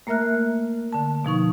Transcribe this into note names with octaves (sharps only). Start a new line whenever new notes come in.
A3 A#3 A#4 E5 F6 F#6
D3 A5
B2 F3 D#4 C#6